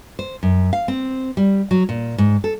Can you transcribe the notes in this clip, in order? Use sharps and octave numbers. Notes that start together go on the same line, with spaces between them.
C5
F#2
F5
C4
G3
F#3
A#2
G#2
A4